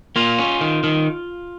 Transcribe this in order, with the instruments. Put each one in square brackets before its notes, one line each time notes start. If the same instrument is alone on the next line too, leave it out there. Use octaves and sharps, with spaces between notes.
[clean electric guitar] A#3 F4
C#4
D#3
D#3